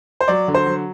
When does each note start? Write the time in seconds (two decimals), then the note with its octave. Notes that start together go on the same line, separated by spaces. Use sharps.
0.21 C5
0.28 F#3 D5
0.48 D3
0.54 C5
0.66 F#3